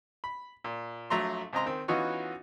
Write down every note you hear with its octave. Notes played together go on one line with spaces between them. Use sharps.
B5
A#2
A#1 F#3 A3 A#5 C6
C#2 C4 D#5 A#5 C6
D#3 C4
E3 B3 C#4 D#4 F4 F#4